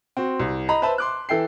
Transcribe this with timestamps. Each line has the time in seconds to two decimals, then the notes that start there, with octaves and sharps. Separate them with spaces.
0.17 C4 F#4
0.39 C2
0.69 D#5 A#5 B5
0.82 B4 C5 E5 A5 B5
0.98 C6 D6 F#6
1.29 E3 A4 E5 G5 C7